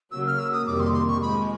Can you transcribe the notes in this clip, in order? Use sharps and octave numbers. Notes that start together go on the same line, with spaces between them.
C#3 F#3 A#3 E6
F6
E6
D#6
F2 C3 D#3 G3 A#3 D6
C6
C6
C#6
G#2 F3 G#3 B5